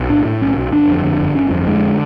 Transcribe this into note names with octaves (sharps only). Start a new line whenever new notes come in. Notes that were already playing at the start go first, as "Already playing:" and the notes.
Already playing: B1
A2 D4
A2
B1 C#4
B1
G1 D4
F2
D3
G1
G1 C#4
F2
D3 G#3